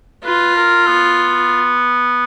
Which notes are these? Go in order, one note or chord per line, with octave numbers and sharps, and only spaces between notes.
F4 B4
A#4
B3